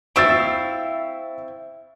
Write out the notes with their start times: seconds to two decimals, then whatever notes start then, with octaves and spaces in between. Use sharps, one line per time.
0.16 C4 E4 F5 C#6 E6 A6